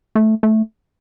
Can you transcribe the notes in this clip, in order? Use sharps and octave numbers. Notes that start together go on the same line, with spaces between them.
A3
A3